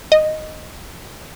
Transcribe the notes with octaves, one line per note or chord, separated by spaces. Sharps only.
D#5